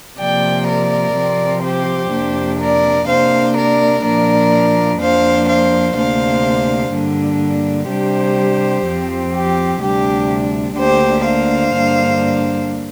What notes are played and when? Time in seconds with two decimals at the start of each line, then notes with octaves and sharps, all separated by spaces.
0.19 C3 F3 A#3 D5 G5
0.68 A#4 D5
1.16 C3 F3 C4
1.64 G4 C5
2.12 F2 C3 A#3 D4
2.60 A#4 D5
3.08 C3 A#3 D4 C5 F5
3.57 A#4 D5
4.04 A#2 F3 A#3 D4 A#4 D5
5.01 F2 F3 A#3 D4 C5 F5
5.49 C5 F5
5.97 D2 C3 A#3 D4 C5 F5
6.93 G2 D3 A#3 D4
7.90 C3 G3 D4 G4 C5
8.87 F2 F3 C4
9.34 G4
9.83 D2 C3 G3 D4 G4
10.78 D2 D3 A#3 D4 G4 C5
11.27 C5 F5
11.76 G2 D3 A#3 D4